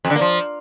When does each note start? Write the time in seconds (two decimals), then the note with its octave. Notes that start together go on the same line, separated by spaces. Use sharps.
0.05 F2
0.10 D3
0.16 A#3
0.21 F3